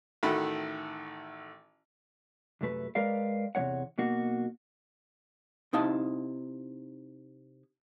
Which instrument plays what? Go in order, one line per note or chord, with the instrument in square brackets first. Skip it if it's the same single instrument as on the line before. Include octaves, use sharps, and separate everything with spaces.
[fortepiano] A1 D#3 A3 F#4 A4 B5
[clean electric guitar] C2 F#2 A3 B4
G#3 A#4 B4 D5 F5
E2 C3 D#3 A#3 C#5 F#5
B1 B2 A#3 F#4
[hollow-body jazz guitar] C3 D#4 E4 F5 A5